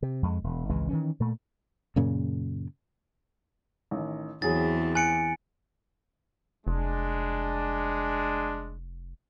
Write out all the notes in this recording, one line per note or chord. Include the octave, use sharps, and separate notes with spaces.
C3
F2 G#3
E1
G#1 C#2 E3 G#3
D#3 E3 C#4
A#2 A3
F#2 A#2 C#3
A1 D#3
E2 E3 F#3 C4 G#4 A6
G#5 F#6 C#7 D7
F1 G#3 D4